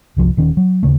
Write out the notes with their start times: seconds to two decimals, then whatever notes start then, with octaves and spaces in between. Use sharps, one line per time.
0.17 G1 C2 F3
0.37 D#1 D#3 C#4
0.57 F#3
0.83 D#2 C#3 A3